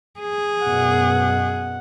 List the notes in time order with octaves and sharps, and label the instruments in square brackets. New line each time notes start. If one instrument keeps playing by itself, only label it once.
[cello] G#4
[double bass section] F#2 B2 [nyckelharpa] F#5